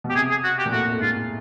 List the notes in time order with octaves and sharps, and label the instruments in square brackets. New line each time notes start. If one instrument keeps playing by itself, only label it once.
[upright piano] B2
[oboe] G4
[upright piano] C3 [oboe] G#4
[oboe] G#4
F#4
G4
[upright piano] A#2
[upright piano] A2 [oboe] F#4
[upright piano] A2
[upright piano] G#2 [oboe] F4